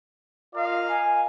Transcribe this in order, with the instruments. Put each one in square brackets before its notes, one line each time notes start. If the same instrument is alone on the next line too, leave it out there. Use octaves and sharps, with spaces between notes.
[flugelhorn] F4 [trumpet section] A#4 D#5 F5
[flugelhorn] G#5